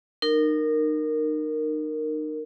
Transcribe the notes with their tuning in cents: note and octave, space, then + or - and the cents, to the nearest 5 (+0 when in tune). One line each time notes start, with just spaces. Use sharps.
D#4 -35 A#4 -5